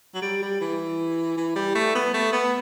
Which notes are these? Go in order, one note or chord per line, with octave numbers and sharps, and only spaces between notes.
F#3
G3
G3
E3
E3
G3
A3
B3
A3
B3